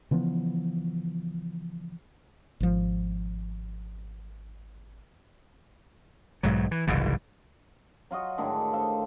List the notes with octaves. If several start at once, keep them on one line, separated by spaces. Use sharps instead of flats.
C#3 E3 F3 B3
G#1 F3
B1 G#2 F#3
E3
F#1 C2 G#2 E3
F#3 F4 F#4 D#5
A2 D3 D#3 G#3
A4 C5 F5